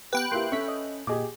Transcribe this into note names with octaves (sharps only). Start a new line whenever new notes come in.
B3 G4 B4 G5 F#6
A#3 E4 G4 E5 C6
C#4 A4 E5 C#6 B6
D#5
A#2 G4 G#4 D#5 D6